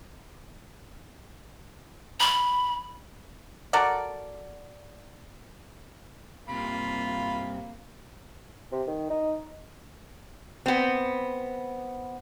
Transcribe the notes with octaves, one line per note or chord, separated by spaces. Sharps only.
B5
F#4 A4 A#4 D5
G2 C3 A#3 F4 B5
C3
D#3
D#4
B3 C4